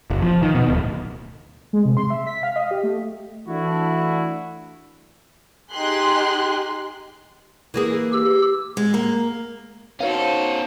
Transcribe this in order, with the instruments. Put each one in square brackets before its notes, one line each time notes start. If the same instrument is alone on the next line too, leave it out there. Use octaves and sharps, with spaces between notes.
[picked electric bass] F#1
F3
D#3
B2
D1
[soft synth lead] G#3
C3
C6
E5
B6
F5
D#5
G4
A3
[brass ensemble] E3 A3 D4 E4 F#4
[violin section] D#4 G4 G#4 C6 F#6
[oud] E3 A#3 G#4
[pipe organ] G4 E6
[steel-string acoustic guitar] G#3
A#3
[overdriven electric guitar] C#4 C5 [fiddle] D#4 A4 [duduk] F#4 [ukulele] C#5 F5